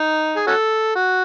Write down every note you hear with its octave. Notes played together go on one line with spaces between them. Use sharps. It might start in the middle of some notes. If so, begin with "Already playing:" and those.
Already playing: D#4
G#4
C#4 F#4 A4
F#4